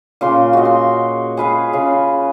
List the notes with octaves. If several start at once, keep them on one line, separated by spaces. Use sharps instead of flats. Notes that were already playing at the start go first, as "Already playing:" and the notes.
A#2 C#3 C6
F#4 D#5
C6
G#4 B4 F5
C#3